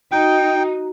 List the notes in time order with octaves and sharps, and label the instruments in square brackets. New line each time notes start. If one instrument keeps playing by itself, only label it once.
[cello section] D#4 [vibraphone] F#4 A#5 [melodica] G5